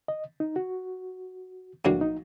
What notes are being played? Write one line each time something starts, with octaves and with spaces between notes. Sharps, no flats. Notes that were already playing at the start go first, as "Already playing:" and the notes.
D#5
D#4
F#4
A#1 A2 F#3 A#3 D4 F#4
D#4